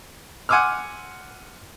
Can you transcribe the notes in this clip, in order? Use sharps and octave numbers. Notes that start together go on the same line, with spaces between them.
F#5 G#5 C6 D6 E6 F6